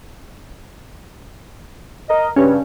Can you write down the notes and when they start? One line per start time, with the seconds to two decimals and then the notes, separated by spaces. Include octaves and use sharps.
2.10 A#4 D#5
2.36 G2 C#3 C#4